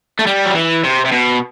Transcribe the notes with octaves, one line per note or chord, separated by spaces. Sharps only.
A3
G3
F#3
E3
C3
C3
B2